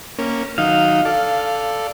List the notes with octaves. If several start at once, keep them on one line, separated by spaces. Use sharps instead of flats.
A#3 C#4
D#3 F#3 D#4 F5
A4 D5